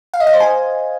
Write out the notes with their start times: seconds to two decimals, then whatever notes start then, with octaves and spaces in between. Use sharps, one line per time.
0.14 F5
0.20 D#5
0.27 F5
0.34 C5
0.40 G#5